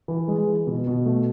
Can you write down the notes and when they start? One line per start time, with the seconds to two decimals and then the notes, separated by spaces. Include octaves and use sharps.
0.08 E3
0.28 G#3
0.47 E3
0.67 B2
0.87 B2
1.06 A3